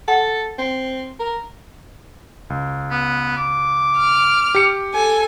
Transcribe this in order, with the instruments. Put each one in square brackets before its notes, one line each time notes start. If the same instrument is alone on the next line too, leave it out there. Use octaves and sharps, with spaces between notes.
[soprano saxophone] A4 [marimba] F#5
[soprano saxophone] C4
A#4
[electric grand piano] C#2
[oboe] B3
D6
[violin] F6
[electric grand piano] G4 C#7
[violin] A4 G#5